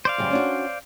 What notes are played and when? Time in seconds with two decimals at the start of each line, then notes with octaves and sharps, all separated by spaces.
0.05 C5 D5 F5
0.18 F#2 C#3 G3
0.31 C#4 D4 F#4